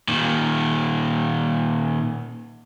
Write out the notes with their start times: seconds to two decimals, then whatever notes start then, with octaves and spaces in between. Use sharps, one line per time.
0.08 A#2 D#3